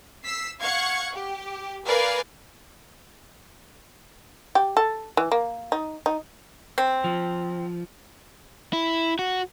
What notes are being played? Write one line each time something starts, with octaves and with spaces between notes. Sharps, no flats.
E6 B6 C7
F5 F#5 C#6 G#6 C#7
G4
A#4 B4 D5 F5 G#5
G4
A4
E3
A#3
D#4
D#4
C4
F3
E4
F#4